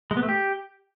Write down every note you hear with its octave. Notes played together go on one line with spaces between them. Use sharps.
G#3
B3
A3
G4